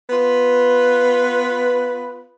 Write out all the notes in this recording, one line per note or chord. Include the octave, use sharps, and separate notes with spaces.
B3 F4 B4